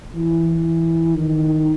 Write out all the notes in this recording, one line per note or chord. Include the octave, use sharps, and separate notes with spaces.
E3
D#3